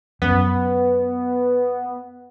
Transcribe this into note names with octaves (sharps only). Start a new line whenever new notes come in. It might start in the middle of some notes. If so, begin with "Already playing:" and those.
F#2 B3